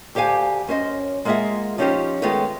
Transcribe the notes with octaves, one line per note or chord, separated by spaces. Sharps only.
D2 G4 C5 F5 G#5
F#2 C#4 C5 D#5
G#3 A#3 F4 G#4 E5 F#5
F3 C#4 D#4 F4 G4 C5
D#3 G#3 A3 B3 F4 C#5